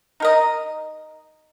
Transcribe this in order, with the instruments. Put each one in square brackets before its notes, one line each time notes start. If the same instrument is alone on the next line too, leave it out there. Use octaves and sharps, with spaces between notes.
[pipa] D#4 A#4 D#5